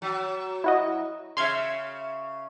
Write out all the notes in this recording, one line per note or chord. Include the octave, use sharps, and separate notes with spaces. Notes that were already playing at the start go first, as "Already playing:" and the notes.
F#3
E4 F#4 D#5
C#3 E5 C6 F6 G#6